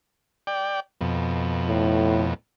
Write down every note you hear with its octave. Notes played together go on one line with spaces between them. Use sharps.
D5 G5
F2 B2
A2